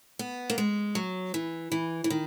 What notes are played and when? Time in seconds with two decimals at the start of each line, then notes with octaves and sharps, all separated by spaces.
0.19 B3
0.50 A#3
0.58 G#3
0.95 F#3
1.34 E3
1.72 E3
2.04 E3
2.10 D#3